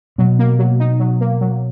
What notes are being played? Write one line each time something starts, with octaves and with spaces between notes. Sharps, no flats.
B2 F#3
A#3
F#3
D#4
F#3
A#3
F#3